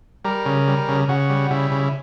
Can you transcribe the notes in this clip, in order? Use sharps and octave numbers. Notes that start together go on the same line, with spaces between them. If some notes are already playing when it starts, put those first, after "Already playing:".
G3 A#4
C#3
G3
C#3
C#3 F#4
G3
C#3 E4
C#3